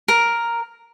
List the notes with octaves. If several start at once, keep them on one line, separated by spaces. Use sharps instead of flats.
A#4